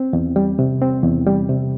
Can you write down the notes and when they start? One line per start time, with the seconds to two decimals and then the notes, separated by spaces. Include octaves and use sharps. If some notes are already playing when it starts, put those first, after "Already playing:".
Already playing: C4
0.13 E2
0.36 G3
0.59 C3
0.82 C4
1.03 E2
1.27 G3
1.49 C3